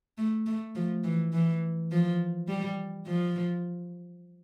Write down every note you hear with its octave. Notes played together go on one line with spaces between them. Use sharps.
A3
A3
F3
E3
E3
F3
G3
F3